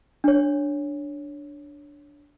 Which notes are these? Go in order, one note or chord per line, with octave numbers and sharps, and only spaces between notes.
D4 C#5